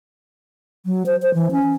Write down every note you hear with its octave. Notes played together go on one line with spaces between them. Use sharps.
F#3
C5
C5
E3
C#4